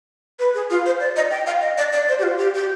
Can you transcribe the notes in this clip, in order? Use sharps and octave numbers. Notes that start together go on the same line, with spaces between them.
B4
G#4
F4
C5
D5
D#5
G5
F5
D#5
D5
D5
C5
G4
F4
G4
G4